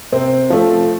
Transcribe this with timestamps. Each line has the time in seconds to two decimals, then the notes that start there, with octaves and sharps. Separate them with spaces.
0.12 C3 C4 C5
0.50 F3 A3 C4